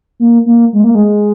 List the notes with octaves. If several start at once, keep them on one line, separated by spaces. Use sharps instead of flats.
A#3
A#3
G#3
A#3
G#3